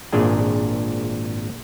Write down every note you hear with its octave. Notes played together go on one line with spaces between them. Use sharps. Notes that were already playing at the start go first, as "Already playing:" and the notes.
G#1 A#2 D4 G#4 G#5